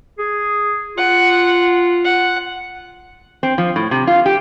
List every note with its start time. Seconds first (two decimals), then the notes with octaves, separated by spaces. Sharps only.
0.19 G#4
0.97 F4 F#5
2.05 F#5
3.43 C4
3.58 F3
3.76 A2
3.91 C3
4.07 F4
4.26 G4